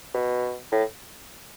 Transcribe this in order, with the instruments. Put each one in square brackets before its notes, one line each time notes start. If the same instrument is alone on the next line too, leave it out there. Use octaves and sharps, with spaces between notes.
[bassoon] B2
A2